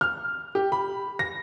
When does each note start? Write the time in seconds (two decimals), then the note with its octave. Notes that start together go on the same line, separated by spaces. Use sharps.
0.01 F6
0.55 G4
0.72 B5
1.19 A#6